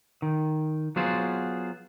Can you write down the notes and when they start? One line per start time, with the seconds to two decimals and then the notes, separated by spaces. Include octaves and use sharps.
0.22 D#3
0.96 F#3 B3 F4 G#4 C5